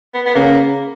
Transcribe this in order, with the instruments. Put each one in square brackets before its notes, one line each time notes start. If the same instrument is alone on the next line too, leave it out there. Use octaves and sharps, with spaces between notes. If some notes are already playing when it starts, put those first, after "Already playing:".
[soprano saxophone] B3
B3
[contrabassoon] C#3 [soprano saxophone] A#3